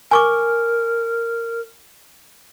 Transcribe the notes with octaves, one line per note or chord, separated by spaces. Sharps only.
A#4 G#5 C#6 D6